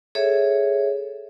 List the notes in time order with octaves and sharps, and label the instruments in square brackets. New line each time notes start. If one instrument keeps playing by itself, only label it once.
[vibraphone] G#4 A4 C#5 E5